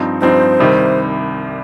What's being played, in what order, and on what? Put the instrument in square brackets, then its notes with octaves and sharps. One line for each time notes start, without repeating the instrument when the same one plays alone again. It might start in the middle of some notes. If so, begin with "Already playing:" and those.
Already playing: [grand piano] G2 F3 C4 D#4
[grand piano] G2 F3 C4 D#4 [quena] C5
[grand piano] C2 C3 D#3 G3